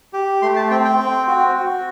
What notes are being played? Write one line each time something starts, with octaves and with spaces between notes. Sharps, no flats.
G4
A3 C6
A5
C4 G5
G5
C4
F#4
F#4